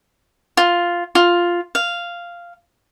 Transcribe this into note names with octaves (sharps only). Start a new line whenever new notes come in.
F4
F4
F5